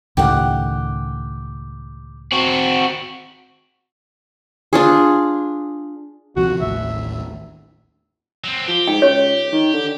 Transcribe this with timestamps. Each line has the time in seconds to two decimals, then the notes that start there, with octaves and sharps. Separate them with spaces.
0.17 C#2 A2 D#3 G4 F#5
2.32 C4 F#4
4.73 D4 F4 G#4
6.36 D2 C3 F3 F#4
6.61 A1 D#2 A2 E5
8.44 F#3 C4
8.68 F3 G4
8.88 G#2 G5
9.02 C#2 C#5
9.53 D#3
9.73 D3